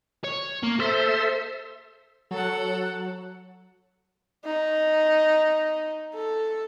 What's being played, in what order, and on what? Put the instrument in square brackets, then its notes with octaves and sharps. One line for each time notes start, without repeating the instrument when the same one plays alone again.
[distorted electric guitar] C#5
A#3
[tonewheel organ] A4 E5 [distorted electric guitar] C5
[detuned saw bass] F#3 [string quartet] A4 F#5
[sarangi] D#4
A4